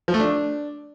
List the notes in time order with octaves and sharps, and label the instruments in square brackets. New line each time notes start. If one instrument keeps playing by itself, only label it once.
[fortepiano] F3
A3
D4